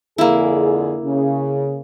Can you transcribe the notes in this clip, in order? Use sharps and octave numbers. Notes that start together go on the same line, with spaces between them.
F2 D3 A#3 E4 G#4
C#3